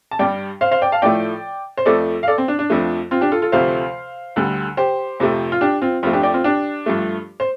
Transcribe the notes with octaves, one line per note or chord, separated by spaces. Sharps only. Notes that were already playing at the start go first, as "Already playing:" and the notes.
A5
G2 G3 D5 G5
C5 F5
C5 F5
D5 G5
F5 A5
A2 F3 A3 D5 G5
C5
F2 F3 A3 A4 D5
F5
A4 D5
C4
D4
D4
F2 F3 A3
C4 F4
D4 G4
F4 A4
F4 A4
D2 C3 F3 A3 C5 F5
D2 D3 G3
G4 C5
F2 C3 F3 A3
F4
D4 G4
C4 F4
F2 F3 A3 C4 F4
D4 G4
D5 G5
C4 F4
D4 G4
G2 F3 A3
C5